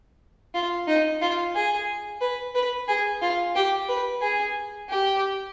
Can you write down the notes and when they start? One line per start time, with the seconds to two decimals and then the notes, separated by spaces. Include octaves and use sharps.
0.54 F4
0.87 D#4
1.22 F4
1.55 G#4
2.21 B4
2.55 B4
2.88 G#4
3.22 F4
3.55 G4
3.89 B4
4.22 G#4
4.89 G4